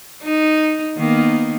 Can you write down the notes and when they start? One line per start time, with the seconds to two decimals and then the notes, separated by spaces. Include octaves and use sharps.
0.23 D#4
0.97 D#3 A#3 B3